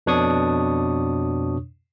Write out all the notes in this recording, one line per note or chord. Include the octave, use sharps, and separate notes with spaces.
F2 B2 D4 C#5 C#6 D#6